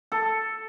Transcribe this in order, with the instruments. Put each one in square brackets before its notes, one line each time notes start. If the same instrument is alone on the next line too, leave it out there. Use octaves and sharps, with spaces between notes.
[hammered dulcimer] A4